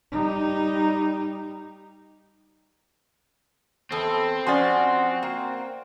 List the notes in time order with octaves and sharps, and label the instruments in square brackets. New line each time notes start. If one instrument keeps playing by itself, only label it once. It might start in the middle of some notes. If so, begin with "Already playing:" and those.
[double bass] G3 D#4
[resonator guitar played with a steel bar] E2 [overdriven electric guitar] C4 [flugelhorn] A4
[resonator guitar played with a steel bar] F3 C#4 D5 [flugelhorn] F#4 [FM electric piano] C5 G#5 C6
[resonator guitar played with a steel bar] A#3